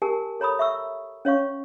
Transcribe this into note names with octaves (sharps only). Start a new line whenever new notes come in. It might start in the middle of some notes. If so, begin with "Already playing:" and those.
G4 A#4 G#5 A5
A4 C#5 A#5 B5 D#6
E5 C#6 E6
C#4 C#5 F5 C#6